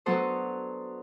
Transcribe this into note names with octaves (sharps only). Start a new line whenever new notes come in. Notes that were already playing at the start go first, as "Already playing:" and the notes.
F#3 B3 D4 A4 C5 D#6